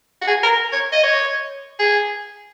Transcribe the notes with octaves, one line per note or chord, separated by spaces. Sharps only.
F#4
G#4
A#4
C#5
D#5
C#5
G#4